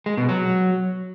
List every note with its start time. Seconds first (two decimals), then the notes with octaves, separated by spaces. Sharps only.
0.06 G#3
0.17 B2
0.29 F#3